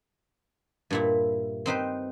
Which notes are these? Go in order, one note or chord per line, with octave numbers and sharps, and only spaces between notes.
G2 A#2 E4
C4 D#4 B4 C5